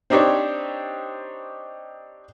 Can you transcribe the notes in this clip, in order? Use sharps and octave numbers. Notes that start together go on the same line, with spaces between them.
C4 D4 D#4 G4 C5 C#5